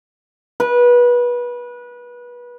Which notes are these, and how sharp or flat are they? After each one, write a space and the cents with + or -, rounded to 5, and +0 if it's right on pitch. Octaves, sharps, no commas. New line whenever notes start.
B4 -25